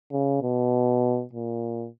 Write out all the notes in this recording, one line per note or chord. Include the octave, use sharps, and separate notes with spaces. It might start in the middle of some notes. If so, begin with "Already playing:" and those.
C#3
B2
A#2